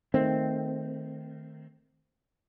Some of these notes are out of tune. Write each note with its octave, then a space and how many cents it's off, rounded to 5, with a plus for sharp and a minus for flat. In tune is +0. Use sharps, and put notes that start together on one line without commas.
D#3 +0 A3 +5 C4 -5